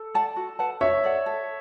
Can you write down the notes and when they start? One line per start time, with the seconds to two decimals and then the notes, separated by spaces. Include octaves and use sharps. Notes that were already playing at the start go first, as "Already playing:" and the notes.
Already playing: A4
0.14 D5 F#5 A5
0.36 F#4
0.59 B4 F#5 A5
0.81 F#4 C#5 E5
1.04 A4 D5 F#5
1.26 A4